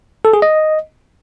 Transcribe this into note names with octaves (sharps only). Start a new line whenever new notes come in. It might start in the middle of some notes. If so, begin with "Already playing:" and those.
A4
G#4
D#5